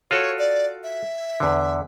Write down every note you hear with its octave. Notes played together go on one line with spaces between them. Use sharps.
F4 F#4 A4 C#5
D5
E5
E2 D3